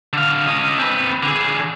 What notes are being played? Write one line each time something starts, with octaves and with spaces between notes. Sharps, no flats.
D3 F5
C#4 D#5
C4 B4
D3 G#4